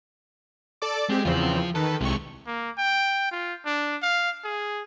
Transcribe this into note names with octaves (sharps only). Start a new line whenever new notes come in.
A4 D5 D6
G#3 C4 G4
E2 C#3 F3 C4 F4
D#3 A4 B4
C2 C3 G#3 C#6
A#3
G5
F4
D4
F5
G#4